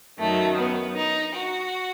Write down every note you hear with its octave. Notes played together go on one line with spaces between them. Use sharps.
F#2 D#3 F#3 A3
B3
D#4
F#4